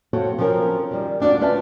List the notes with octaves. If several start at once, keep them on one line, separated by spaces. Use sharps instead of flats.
F#3 C4 F#4 A4 C#5 F5
F3 F#3 C4 C#4 A#4
D#3 G3
D2 D4 F4 F#4 D5
A3 C#4 F4 B4 E5 A5